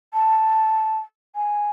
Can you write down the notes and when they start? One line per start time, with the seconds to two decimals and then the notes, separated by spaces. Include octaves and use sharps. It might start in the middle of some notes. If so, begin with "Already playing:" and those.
0.14 A5
1.35 G#5